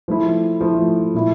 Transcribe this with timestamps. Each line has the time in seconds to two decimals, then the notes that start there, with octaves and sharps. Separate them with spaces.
0.08 F3 A3 E4
0.60 F3 A3 E4
1.14 A#2 A3 E4